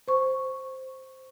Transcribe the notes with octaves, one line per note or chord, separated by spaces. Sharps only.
C5 C#6